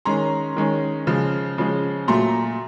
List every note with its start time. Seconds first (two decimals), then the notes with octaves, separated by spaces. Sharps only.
0.05 D#3 G#3 C#4 A#5 C6
0.56 D#3 G#3 C#4
1.07 C#3 F3 G#3
1.58 C#3 F3 G#3
2.08 A#2 F#3 A3 A#5 C6